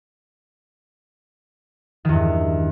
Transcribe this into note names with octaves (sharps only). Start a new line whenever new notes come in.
E2 G2 D#3